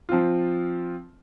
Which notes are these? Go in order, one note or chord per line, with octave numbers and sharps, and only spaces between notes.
F3 C4 F4